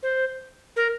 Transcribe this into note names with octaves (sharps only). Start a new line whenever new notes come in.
C5
A#4